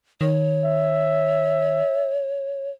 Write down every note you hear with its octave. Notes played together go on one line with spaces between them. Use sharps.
D#3 C#5
E5